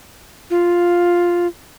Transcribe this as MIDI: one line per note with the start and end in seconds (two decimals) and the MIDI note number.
0.50 1.47 65